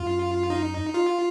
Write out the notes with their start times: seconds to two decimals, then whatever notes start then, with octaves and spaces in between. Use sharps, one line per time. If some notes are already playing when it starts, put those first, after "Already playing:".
Already playing: F#2 F4
0.50 D#4
0.94 F4